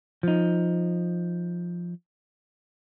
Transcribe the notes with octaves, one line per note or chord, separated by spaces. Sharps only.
F3 D#4